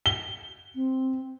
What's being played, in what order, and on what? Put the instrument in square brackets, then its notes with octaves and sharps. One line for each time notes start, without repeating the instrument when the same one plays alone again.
[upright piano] G7
[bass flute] C4